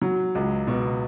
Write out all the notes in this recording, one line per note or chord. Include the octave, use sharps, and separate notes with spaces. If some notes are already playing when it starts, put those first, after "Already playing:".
F#3
C#2
B2